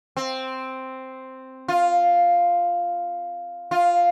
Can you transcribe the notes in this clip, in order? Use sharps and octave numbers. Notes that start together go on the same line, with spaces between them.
C4
F4
F4